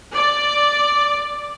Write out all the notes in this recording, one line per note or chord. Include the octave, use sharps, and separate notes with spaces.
D5